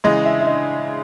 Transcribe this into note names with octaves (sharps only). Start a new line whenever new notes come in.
C#3 E3 G#3 D#5
E5
E5
D#5